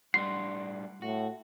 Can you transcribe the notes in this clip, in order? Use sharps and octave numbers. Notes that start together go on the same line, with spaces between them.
A2 G3 D4 F#5 C6 C7
A2 F#4